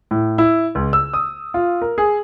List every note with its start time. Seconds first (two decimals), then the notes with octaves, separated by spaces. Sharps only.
0.11 A2
0.38 E4
0.75 C#2
0.93 E6
1.14 D#6
1.54 F4
1.82 A#4
1.98 G#4